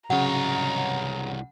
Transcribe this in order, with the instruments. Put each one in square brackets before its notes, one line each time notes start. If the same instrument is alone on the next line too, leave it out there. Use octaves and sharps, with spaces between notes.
[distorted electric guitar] C2 C#5 [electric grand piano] C#3 F#3 [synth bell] F#5 [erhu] A#5